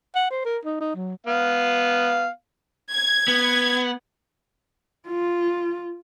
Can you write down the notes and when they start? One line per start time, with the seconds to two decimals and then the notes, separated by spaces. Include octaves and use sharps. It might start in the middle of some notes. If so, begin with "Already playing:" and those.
0.15 F#5
0.31 C5
0.45 A#4
0.65 D#4
0.80 D#4
0.96 F#3
1.27 B3 F5
2.92 G#6
3.28 B3
5.08 F4